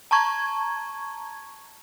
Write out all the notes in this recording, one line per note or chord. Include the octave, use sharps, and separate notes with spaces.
A5 A#5 C#6 G#6